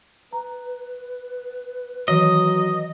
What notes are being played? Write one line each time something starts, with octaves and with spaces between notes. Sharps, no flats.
B4 A#5
D#3 E3 F#3 C#5 D#5